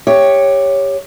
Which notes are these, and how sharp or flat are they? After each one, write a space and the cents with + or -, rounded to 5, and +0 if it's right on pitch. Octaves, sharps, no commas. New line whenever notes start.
G4 +10 C#5 +0 E5 +0